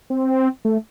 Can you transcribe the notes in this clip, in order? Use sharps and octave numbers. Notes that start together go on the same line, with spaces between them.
C4
A3